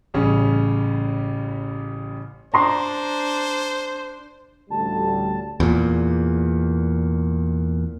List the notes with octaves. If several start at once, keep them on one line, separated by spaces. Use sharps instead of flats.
A1 C#3 G3 C#4
D4 C5 A#5 C6
A1 D2 G3 A5
E2 A#2